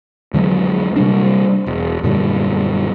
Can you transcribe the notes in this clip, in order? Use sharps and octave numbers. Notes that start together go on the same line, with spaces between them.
F2 D3 F#3 G#3
C3 G3 D4
E1
F#2 A#2 D3 G3